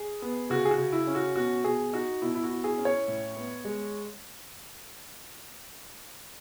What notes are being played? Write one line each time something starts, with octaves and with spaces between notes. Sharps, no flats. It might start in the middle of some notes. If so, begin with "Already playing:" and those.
Already playing: G#4
B3
C#3 F#4
G#4
F#4
C#3
E4
C#4
F#4
B2 F#4
B2 G#4
D#4 F#4
B2 E4
E4
F#4
E4
G#4
C#4
C#5
A2
B3
G#3